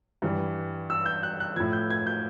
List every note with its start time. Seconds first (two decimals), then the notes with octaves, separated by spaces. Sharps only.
0.22 G2 E3 G3
0.90 E6
1.06 G6
1.23 F#6
1.40 F#6
1.56 A2 F3 G#6
1.73 G6
1.90 G#6
2.07 G6